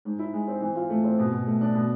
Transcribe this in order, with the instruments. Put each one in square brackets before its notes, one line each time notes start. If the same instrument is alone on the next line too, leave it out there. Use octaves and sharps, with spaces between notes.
[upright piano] G#2
E4
G#3
C4
E3
F4
A3
C4
B2
B2
A3
D4
B2